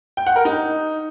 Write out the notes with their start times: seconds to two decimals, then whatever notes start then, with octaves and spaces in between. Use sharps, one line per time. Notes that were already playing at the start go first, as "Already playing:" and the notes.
0.17 G5
0.27 F#5
0.36 A#4
0.45 D#4